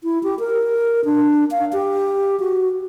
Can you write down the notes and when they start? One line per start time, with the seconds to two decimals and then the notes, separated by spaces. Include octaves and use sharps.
0.04 E4
0.23 G4
0.39 A#4
1.05 D4
1.51 F5
1.73 G4
2.40 F#4